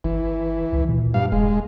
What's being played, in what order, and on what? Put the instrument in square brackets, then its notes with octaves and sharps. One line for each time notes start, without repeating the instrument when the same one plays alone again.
[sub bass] G1 [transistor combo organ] E3
[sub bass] C#2
A#2
[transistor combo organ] G2 F5
[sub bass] E1 [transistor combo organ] G#3